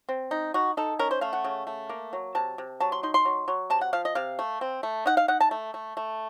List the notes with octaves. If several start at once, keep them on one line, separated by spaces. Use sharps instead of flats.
C4
D#4
D#4 F#4
D#4 A4
C#4 A#4
C5
A3 F5
F#5
C#3
A3
A#3
F#3
C3 A5
C3
F#3 A5
C6
D#4 C6
C6
F#3
F#3
C3 A5
F#5
F3 F5
D#5
C3 F5
A3
C4
A3
D#4 F#5
F5
D#4 F#5
A5
A3
A3
A3